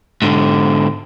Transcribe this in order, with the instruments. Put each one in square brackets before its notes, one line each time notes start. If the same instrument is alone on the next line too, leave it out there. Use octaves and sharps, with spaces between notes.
[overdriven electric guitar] G#2 D3